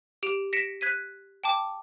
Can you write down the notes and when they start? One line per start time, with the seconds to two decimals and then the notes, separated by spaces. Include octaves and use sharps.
0.23 G4 D7 F7
0.53 A#6 B6 C#7 D7 E7
0.81 F#6 G#6 B6 D#7
1.44 G5 A5 D6